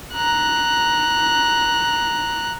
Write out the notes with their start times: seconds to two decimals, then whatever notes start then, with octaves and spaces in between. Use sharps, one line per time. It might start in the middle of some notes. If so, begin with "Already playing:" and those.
0.14 A#5 F#6